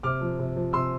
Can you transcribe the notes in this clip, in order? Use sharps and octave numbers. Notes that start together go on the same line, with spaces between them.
C3 D6 F6
F3
C3
F3
C3 C6 E6